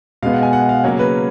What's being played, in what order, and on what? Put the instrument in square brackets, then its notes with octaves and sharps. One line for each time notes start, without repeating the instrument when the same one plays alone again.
[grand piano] B2 G#3 B3 F5
F#5
G#5
F#5
F5
C#3 F#3 A#3 C#4 C#5
B4